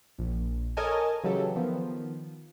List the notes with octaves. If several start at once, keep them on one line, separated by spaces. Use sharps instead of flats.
A#1
A4 A#4 C#5 D#5 G#5 A5
C#3 E3 F#3 G4 A4
D#3 F3 B3